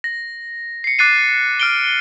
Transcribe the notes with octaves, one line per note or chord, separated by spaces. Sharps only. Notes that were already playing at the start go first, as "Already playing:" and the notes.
A#6
C7 C#7
D6 F#6 A6 C7 D#7
F6 D7 G7